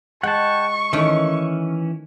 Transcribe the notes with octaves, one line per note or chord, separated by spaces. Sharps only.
G#3 F#5 G5 A5 C#6
D#3 E3 A3 C#4